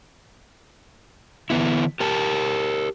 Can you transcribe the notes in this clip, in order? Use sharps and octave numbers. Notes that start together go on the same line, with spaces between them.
D3 E3 B3 E4
G4 A#4 A5